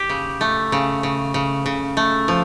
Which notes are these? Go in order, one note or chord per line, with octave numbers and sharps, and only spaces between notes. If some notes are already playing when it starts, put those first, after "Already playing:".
Already playing: G4
C#3
A3
C#3
C#3
C#3
C#3
A3
F3